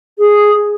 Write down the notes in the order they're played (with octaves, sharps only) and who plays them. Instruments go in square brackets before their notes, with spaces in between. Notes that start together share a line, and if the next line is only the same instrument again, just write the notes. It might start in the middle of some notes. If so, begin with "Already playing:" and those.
[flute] G#4